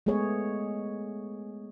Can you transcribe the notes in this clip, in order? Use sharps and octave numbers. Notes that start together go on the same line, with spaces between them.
G#3 A3 B3 G#4 C#5